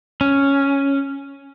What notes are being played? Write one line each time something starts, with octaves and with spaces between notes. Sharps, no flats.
C#4